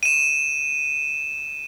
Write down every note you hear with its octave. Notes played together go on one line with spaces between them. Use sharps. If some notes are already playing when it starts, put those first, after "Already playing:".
D#7 E7